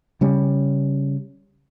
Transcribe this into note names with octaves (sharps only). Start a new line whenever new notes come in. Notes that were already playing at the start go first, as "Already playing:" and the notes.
C#3 G3 C#4